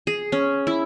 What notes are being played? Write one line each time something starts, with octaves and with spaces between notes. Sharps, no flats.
G#4
C#4
E4